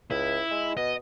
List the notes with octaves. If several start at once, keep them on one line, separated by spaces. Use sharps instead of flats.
C#2 E4
G#3
B2 D#5